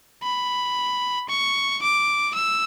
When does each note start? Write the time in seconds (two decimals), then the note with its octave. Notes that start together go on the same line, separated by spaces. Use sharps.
0.23 B5
1.29 C#6
1.82 D6
2.35 E6